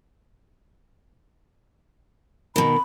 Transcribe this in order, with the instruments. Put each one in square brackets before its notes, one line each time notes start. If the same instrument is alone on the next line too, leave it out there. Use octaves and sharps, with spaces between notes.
[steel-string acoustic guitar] B2 D#3 [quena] B5